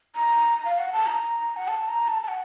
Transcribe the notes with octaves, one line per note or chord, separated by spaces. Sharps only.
A#5
F5
F#5
A5
A#5
F#5
A5
A#5
A5
A5
F#5